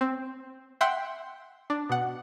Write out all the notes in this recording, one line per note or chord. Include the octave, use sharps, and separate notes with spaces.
C4
E5 F#5 G5 C6
D4
B2 F#5